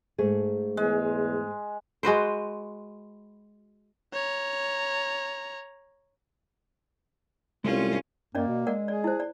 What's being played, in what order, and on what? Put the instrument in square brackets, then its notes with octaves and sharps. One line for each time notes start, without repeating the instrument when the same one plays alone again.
[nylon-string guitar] G#2 A3 G#4
[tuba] E2 [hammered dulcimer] G#3
[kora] G#3 F#4 B4 C5
[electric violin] C#5 A#5
[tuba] C2 [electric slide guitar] G#3 A3 C5 [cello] C#4 F4
[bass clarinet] F#2 [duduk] A#3 [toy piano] C#4 D5 D#5
[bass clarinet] B2
[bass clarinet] G#3 [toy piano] A#4 D5 F#5
[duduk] G#4 [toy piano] D5
[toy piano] E4 C5
D5